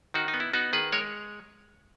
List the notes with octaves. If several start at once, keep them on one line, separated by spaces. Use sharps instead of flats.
D#3 D#4 F#4
D#4
B3
E4
B3 D#4 F#4
D#3 G#4 B4
G#3 A#4 C#5